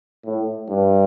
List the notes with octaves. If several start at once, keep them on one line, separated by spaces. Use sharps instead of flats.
A2
G2